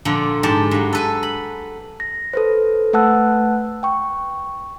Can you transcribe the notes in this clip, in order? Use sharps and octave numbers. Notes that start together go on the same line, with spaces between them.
A#2 D3 F3
G#2 G4 A5
G2 F#3
A4 B4 G#5
B5
A#6
A4 B4 C5
A3 B4 F#5 A5 E6 F#6
G5 C#6